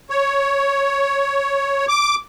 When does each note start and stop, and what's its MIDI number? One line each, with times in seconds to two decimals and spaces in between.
0.10 1.86 73
1.88 2.15 86